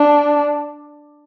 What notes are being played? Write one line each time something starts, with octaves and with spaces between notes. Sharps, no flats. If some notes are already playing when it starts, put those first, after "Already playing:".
Already playing: D4